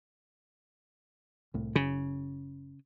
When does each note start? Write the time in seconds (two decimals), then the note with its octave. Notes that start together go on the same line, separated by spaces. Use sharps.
1.54 C2 A2
1.76 F#1 C#3